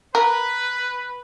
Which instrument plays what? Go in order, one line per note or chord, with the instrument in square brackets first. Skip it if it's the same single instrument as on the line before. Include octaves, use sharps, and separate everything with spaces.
[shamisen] A#4 [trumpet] B4